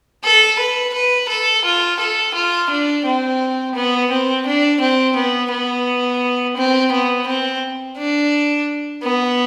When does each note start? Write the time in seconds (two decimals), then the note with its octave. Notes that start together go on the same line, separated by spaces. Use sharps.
0.25 A4
0.59 B4
0.94 B4
1.29 A4
1.65 F4
2.00 A4
2.35 F4
2.70 D4
3.06 C4
3.75 B3
4.11 C4
4.47 D4
4.81 C4
5.16 B3
5.52 B3
6.57 C4
6.92 B3
7.28 C4
7.98 D4
9.03 B3